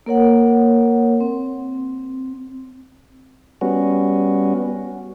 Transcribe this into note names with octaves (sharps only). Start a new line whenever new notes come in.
A#3 A#4 C#5 F#5
C4
G3 B3 C#4 F#4